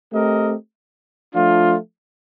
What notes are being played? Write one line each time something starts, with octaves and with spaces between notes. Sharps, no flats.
A3 C4 G4 A#4 D#5
F3 A3 D4 F4